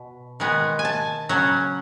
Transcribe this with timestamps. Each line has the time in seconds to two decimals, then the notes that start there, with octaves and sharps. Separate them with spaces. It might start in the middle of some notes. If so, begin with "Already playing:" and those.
Already playing: B2
0.40 D#3 G#3 B3
0.79 G#5
0.85 A5
1.29 C#3 F#3 C#4